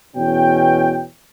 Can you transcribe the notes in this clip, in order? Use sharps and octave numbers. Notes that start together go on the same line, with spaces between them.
E2 B2 C#4 G5